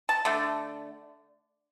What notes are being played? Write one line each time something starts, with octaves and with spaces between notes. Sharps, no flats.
A5
D3 A3